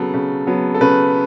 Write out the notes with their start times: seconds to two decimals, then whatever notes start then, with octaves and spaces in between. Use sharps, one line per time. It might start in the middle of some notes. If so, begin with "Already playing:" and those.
Already playing: C#3 F#3 B3 A4
0.14 C#3
0.47 F#3 B3
0.74 A4
0.81 C#3 B4